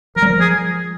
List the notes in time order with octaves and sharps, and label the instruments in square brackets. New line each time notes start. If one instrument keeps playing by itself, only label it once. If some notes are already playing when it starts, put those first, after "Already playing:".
[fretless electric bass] F3 [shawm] A#4
[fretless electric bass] G3
F3
[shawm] G#4